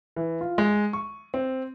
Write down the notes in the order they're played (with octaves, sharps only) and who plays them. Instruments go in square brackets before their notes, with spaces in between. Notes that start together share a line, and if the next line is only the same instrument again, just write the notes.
[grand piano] E3
F4
G#3
C#6
C4